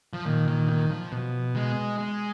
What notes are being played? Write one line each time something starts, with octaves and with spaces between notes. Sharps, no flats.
F3
A#2 D#3
D#3
D#3
F3
B2
G#3
G#3